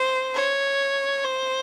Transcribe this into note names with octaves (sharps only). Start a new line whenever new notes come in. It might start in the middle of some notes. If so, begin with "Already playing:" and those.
Already playing: C5
C#5
C5